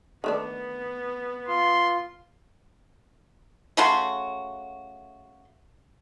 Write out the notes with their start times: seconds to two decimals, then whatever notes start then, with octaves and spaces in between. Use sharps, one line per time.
0.24 D#3 A3 B3 D4
1.48 F4 C6
3.77 C#3 A3 F#4 C6